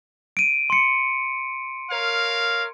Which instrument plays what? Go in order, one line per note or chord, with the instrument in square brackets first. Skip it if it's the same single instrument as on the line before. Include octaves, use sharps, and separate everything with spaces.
[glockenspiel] D7 D#7
C6 C#7
[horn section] A#4 C#5 F5